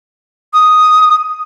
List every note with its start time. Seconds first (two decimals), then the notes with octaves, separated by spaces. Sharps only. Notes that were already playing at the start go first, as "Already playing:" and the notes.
0.54 D#6